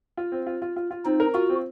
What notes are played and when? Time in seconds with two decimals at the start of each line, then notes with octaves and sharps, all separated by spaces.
0.17 F4
0.32 C4
0.47 F4
0.62 F4
0.76 F4
0.91 F4
1.05 C4 D#4
1.20 A#4
1.34 F4 F#4
1.49 C4